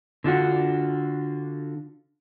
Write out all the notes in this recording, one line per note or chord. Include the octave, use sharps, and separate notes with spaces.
D3 D4 F4 F#4